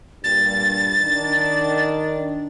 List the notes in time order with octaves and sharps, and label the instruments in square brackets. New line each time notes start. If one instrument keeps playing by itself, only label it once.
[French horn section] G2 A#2 G3 [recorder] A6
[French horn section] D#3 D4